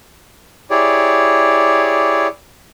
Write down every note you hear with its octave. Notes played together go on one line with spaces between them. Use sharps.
E4 G4 G#4 C#5 D5